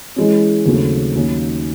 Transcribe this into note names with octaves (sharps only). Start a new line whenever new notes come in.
E3 G#3 C#4
D#2 C#3 F#3 A3 C4
D#2 D#3 F#3 A#3 C#4